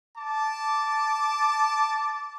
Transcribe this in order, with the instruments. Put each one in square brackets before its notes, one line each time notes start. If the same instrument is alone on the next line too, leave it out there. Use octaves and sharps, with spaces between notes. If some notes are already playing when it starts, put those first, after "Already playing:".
[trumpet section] A5 D6